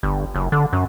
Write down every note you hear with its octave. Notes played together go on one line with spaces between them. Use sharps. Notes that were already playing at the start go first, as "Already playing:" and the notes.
G1
F#1
D3
F#2